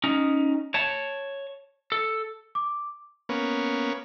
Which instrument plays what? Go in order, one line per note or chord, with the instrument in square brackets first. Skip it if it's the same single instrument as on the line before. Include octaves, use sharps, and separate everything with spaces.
[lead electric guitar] C#4 D#4
C#5 A5
A4
[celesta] D6
[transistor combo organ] A#3 B3 C#4